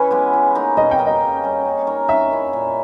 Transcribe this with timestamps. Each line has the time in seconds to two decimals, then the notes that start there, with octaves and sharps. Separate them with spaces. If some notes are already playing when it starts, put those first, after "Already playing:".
Already playing: E3 C#4 E4 B4
0.11 G#3 B3 G4
0.33 E3
0.55 A#3 D#4
0.77 B2 D#5
0.91 G5
0.99 A#3 D#4
1.06 D#5
1.21 C#3
1.43 G3 C#4
1.65 A#3
1.87 D#4 A#4 C#5
2.08 D#3 E5
2.31 A#3 E4 G#4
2.53 A#2